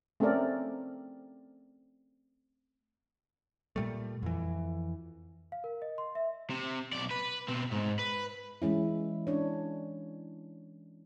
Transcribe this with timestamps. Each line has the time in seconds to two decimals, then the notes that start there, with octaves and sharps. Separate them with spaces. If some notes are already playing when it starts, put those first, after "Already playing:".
0.20 A3 C4 C#4 A4 A#4 D5
3.76 A#2 G3 A3
4.23 F2 E3
5.52 F5
5.64 A#4
5.82 D#5
5.98 C6
6.15 E5
6.50 C3
6.93 B1 D5
7.10 B4
7.48 B2 C4
7.71 G#2
7.99 B4
8.62 E3 G#3 C#4 E4
9.27 C#4 D4 C#5